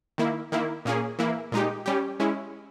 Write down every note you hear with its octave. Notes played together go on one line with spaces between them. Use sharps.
D#3 A#3 E4
D#3 A#3 E4
A#2 A#3 C#4 G#4
E3 A#3 E4
A#2 G#3 D#4 G4
G3 C#4 G4
G#3 C#4 E4